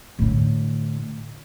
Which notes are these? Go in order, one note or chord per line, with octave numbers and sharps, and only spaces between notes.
A2 D3